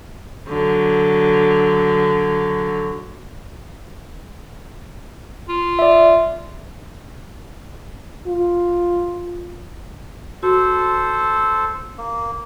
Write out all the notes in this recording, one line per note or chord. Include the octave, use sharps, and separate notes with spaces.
D3 F#3
F4
D5 E5
F4
F#4 A4 C5
A#3